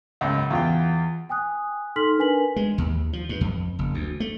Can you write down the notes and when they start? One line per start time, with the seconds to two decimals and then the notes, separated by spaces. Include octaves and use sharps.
0.21 C#2 F#2
0.50 E2 F4 G5
1.29 G5 G#5 D#6 F#6
1.96 D#4 A4 C6 F6 B6 F#7
2.18 D4 A#4 B4 G#5 B6 F#7
2.56 G#3
2.78 D#2
3.13 F3
3.29 G2
3.41 F2
3.79 F#1
3.94 D2
4.20 A3